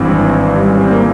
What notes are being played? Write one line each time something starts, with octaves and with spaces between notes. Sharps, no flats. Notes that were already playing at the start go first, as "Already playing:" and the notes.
Already playing: G#1 G2 E3 C4
G3
C#4
C4
A#3